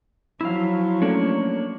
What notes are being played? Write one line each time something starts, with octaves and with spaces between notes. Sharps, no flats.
F3 F#3 E4 F5
A3 A#3 C#4 D4 C#5